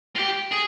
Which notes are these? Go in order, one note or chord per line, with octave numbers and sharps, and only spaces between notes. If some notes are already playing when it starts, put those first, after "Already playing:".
F4
G4
G#4